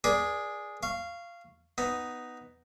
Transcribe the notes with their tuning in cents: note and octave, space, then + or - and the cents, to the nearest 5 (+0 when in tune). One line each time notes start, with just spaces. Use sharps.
G#4 +0 B4 -45 D5 +0
F5 -15 C#6 +0
B3 +5 D#4 +0